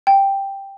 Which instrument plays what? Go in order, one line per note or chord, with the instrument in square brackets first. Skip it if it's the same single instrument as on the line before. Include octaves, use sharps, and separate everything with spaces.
[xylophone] G5